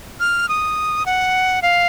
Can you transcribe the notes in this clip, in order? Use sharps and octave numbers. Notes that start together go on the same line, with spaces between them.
F6
D#6
F#5
F5